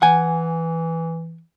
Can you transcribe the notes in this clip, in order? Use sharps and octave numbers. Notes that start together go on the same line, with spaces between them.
E3 F#5 G#5